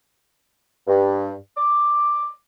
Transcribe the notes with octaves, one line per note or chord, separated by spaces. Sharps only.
G2
D6